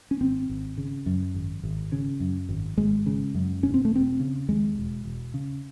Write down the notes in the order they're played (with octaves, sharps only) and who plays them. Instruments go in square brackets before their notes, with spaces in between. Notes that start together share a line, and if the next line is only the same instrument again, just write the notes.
[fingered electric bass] C#4
G#1 C4
G#1
C#3
F#2
G#1
G#1
C#3
F#2
G#1
G#1 G#3
C#3
F#2
E1 C#4
C4
A3
E1 C4
C#3
D#2 G#3
E1
E1
C#3